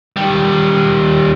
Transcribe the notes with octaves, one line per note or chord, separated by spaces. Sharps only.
D#3 G3